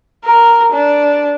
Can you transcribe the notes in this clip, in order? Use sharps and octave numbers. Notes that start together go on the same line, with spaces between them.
A#4
D4